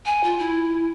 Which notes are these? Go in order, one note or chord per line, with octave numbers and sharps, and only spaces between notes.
G#5
F4
E4